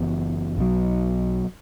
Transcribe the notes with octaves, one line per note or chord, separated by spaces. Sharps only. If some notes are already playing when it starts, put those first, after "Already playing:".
Already playing: F#1 F#2 E3 B3
B1 B2 F#3